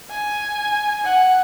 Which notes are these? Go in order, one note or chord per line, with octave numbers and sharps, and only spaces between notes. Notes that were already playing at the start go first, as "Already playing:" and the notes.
G#5
F#5